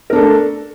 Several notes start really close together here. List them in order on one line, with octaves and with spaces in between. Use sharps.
A#4 D4 A4 A3